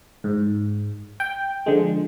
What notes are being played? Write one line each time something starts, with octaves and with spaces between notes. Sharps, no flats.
G#2
G5
D3 F3 G#3